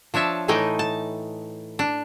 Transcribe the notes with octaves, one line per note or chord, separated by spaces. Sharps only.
F3 D4 C#5 E5 A5
A2 E3 A3 D#4 D#5 G5
A5
D4